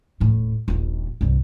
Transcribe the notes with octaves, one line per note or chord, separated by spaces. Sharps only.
D#1 A2
D#1 A#1
C2 G2